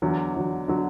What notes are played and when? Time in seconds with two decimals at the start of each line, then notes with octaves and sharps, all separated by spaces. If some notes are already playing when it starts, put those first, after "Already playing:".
0.02 E2 D3 F#3
0.35 E2 D3 F#3
0.68 D3 F#3